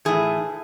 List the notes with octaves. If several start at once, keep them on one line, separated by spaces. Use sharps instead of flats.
A2 E3 G#4